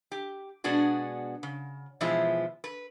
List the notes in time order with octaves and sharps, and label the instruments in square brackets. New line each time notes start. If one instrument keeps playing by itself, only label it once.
[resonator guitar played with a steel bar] G4
B2 G#3 B3 D4 F#4 G#4
C#3
B2 E3 F3 G#3 E4 F4
B4